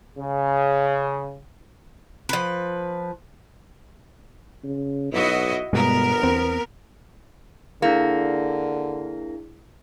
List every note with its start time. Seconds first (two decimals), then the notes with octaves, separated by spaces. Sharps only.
0.18 C#3
2.29 F3 B4
4.64 C#3
5.12 B1 E4 F#4 D#5
5.73 G1 G2 B2 G#3 B3 A#4
6.23 E2 C4
7.82 D3 A#3 D4 E4 G#4